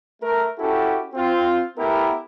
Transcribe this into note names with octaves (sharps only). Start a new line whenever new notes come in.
A3 A#4
C#4 E4 F#4 G4 A4
C4 F4
A3 B3 E4 G4 A#4